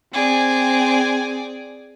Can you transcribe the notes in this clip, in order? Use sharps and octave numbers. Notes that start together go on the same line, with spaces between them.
C4 G#4 D5